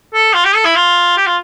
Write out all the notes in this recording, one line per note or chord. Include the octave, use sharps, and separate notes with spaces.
A4
F4
G4
A4
E4
F4
G4
F4